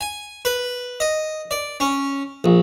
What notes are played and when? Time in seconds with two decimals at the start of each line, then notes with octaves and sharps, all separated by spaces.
0.01 G#5
0.45 B4
1.00 D#5
1.51 D5
1.80 C#4
2.44 A#1